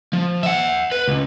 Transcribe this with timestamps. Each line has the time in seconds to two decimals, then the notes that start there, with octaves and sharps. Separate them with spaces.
0.13 F3
0.43 E5 F#5
0.92 B4
1.08 C#2